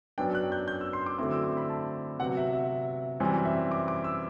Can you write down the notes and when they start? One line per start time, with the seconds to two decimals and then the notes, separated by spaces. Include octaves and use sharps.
0.18 F#2 F#3 B3 D4 G5
0.35 F#6
0.52 G6
0.68 G6
0.81 E6
0.93 C6
1.06 D6
1.18 D3 F#3 A3 C4 E4 D6
1.31 E6
1.44 D6
1.57 B5
1.70 A5
2.19 C3 F#3 B3 F#5
2.37 E5
2.53 E5
3.20 F#2 E3 G3 C4
3.45 E5
3.72 D6
3.88 D6
4.04 E6